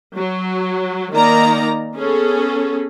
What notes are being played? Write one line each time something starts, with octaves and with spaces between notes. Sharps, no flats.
F#3
D#3 A#3 D#4 D5 A#5
B3 C#4 G#4 A4